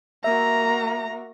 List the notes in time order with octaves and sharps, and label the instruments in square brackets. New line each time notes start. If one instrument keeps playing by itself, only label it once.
[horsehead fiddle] A#3 F#4 [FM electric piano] E5 [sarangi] A#5